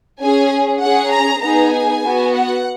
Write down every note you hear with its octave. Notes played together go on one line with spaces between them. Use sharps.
C#4 G#4 G#5
C#4 G#4 F#5
A#5
B3 D#4 G#4 A#5
G#5
B3 F#4
F#5